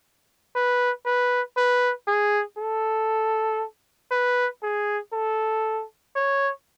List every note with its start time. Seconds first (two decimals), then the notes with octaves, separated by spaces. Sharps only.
0.56 B4
1.06 B4
1.57 B4
2.08 G#4
2.58 A4
4.12 B4
4.63 G#4
5.13 A4
6.16 C#5